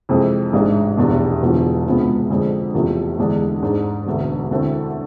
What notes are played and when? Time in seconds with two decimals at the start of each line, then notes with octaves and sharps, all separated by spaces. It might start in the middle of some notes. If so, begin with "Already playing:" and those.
0.09 F2 C3 E3 G#3
0.53 A1 G#2 G#3 D4
0.97 F1 E2 B2 B3 D4
1.42 E1 E2 D3 F3
1.86 D2 C3 F3 G#3 B3
2.30 F2 D3 G#3 D4
2.74 F1 E2 C3 F3 A3
3.19 F1 E2 D3 G#3 D4
3.63 G#2 G#3 D4
4.07 E1 D2 D3
4.51 D2 D3 A3 C4 E4